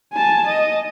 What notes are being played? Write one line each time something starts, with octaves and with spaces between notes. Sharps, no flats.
G#5 A5
D#5